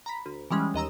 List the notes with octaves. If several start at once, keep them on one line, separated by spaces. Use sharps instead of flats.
A#5 B5 B6
D2
E3 G3 G#3 C#4
D#2 D#5 A#5 E6